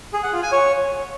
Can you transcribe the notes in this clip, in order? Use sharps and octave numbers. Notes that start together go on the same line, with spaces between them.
G#4
F#5
F4
G#5
C#5